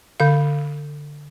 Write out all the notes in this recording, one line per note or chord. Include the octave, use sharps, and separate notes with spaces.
D3 F5